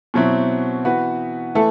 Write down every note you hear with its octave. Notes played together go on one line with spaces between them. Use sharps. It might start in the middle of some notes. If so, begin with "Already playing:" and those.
B2 F#3 C4 E4
E3 B3 F#4 B4
E3 A3 E4 A4